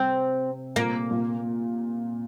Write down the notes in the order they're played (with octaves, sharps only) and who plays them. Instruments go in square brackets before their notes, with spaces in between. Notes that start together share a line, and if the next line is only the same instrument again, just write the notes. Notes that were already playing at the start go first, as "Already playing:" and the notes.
Already playing: [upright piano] C3 [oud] C4
[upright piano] A#2 [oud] A#3
[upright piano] A#2